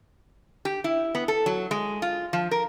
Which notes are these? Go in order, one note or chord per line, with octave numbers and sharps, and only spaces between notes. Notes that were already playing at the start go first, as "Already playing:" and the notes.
G4
E4
B3
A4
F#3
G#3
F4
F3
A#4